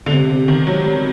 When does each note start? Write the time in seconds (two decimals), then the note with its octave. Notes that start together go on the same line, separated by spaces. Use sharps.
0.06 D3
0.12 C3
0.30 C3
0.48 D#3
0.67 F#3
0.84 G3